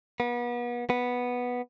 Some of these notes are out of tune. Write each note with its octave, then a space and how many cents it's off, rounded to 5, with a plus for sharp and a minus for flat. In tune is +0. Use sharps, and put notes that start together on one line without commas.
B3 -35
B3 -5